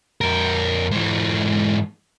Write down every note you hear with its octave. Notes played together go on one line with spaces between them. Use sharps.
F2 A#4
G#2 E3